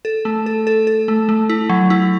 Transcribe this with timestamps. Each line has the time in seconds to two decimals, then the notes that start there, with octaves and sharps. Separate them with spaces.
0.05 A4
0.25 A3
0.46 A4
0.67 A4
0.87 A4
1.08 A3
1.29 A3
1.49 E4
1.69 F#3
1.90 E4